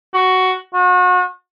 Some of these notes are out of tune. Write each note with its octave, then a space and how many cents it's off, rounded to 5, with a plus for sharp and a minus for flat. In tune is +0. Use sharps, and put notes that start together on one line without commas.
F#4 +10
F#4 -35